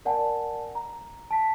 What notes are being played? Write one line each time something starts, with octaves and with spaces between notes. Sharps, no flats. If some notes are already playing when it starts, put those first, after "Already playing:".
A#4 D5 F#5 G#5 A5
A#5
A5 B6